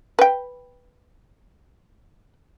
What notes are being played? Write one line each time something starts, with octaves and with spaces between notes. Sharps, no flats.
B4 G5